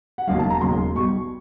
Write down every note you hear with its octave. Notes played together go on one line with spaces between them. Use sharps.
F#5
E1 D#2 C#3 F#3 F5
A5
A#5
E1 D#2 C#3 F#3 C6
B1 B2 G3 C#6